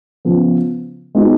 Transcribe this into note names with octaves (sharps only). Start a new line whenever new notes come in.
C#3 F3 B3
G#3 B3 D#4 F#4